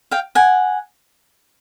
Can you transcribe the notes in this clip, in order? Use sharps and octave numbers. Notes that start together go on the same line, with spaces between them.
F5 G5
F#5 G#5